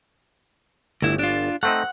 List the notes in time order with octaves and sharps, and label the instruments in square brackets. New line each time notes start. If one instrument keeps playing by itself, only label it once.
[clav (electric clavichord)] G1 [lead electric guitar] D2 E4
[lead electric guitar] D4 F4
[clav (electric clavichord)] A3 C4 D#4 [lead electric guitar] F#5